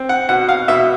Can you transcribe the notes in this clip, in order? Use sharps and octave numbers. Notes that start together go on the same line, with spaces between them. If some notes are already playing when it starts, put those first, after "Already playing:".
Already playing: C4
F#5
B2 F#5
F5
B2 E5